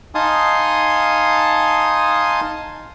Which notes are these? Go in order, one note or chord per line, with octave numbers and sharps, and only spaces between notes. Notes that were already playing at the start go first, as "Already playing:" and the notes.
D#4 F5 G#5 A5 C6 D#6